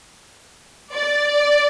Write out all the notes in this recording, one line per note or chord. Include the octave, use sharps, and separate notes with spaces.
D5